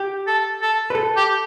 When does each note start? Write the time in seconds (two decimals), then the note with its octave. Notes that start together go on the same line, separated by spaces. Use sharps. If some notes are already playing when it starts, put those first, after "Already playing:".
Already playing: G4
0.27 A4
0.62 A4
0.90 B4
0.95 A4
1.16 G4